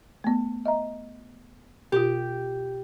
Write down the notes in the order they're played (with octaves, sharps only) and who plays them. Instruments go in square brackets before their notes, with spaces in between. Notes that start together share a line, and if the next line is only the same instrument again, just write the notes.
[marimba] A3 B3
D#5 E5 A#5
[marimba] B2 F4 [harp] G4